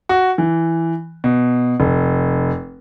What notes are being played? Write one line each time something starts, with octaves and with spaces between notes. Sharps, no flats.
F#4
E3
B2
F1